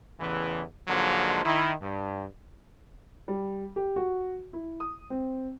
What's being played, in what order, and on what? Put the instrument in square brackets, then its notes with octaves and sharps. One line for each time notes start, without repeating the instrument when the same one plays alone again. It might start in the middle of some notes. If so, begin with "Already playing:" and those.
[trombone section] A1 E2 C#3 E3
G#2 D3 F3 F#3 G#3 A#3
D#3 E4
G2
[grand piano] G3
G4
F#4
E4
D#6
C4